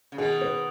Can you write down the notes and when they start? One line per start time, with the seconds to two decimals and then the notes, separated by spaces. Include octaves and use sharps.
0.12 C#3
0.18 B2 D#3 G#4
0.41 B4